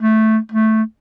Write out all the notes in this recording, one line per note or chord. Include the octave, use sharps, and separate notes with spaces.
A3
A3